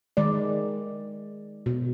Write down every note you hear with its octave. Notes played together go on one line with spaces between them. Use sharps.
D#3 G#3 D5
B2